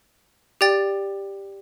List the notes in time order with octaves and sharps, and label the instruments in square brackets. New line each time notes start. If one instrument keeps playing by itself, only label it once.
[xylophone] G4 D5 G5 A6